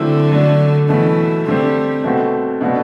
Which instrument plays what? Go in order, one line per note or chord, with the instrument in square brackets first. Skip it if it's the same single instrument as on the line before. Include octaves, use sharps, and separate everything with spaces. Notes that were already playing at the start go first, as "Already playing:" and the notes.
Already playing: [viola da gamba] D3 [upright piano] F#3 A3 C4 E4
[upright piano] F#3 A3 D4
[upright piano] B2 F#3 A3 [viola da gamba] E3
[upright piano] D3 A3 C4 [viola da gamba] G3
[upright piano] B2 A3 C4 F#4
B2 A3 D4 F#4